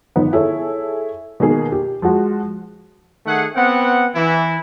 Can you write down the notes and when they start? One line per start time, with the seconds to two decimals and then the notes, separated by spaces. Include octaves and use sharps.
0.16 G1 D#3 B3
0.33 E4 G#4 A4 C#5
1.40 B2 D#3 A#3 G#4
1.72 G4
2.02 F3 G#3 F#4
3.26 D#3 A3 G#4 F#5
3.56 B3 C4 F#5
4.16 E3 E4